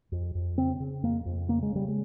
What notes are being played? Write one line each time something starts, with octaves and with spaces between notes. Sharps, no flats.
F2
F2
C#3 C4
C#3
F2 A#3
F2
C#3 A#3
G#3
C#3 G3
G#3